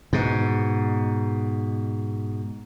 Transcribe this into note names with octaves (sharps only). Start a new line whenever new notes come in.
G#2 B2